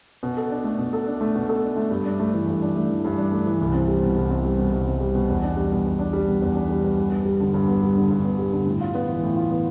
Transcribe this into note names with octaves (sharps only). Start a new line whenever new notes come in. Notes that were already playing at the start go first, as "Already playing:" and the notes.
B2
A4
D4
A3
B2
A4
D4
A3
B2
A4
D4
A3
G2
D4
A3
E3
G2
D4
A3
E3
G2
D4
A3
E3
C2
C4
G3
B2
C2
C4
G3
B2
C2
C4
G3
B2
E2
D4
G3
B2
E2
D4
G3
B2
E2
D4
G3
B2
G2
B3
G3
D3
G2
B3
G3
D3
G2
B3
G3
D3
A2
F4
B3
E3
A2
F4
B3